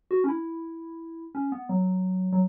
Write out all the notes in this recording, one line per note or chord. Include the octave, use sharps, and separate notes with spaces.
F#4
C#4
E4
C#4
B3
F#3
F#3